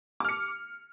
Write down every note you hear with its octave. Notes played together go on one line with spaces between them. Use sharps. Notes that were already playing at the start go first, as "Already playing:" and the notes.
D6 F6 C#7